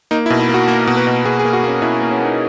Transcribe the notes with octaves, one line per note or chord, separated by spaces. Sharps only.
A#3 D#4
E4
B2
E4
A#3 F#4
A#3 A#4
B2
B4
B2
B2 G#4
G#4
A#3
F#4
A#3 C#4
B2 E4
A#3
C#4
A#3 D#4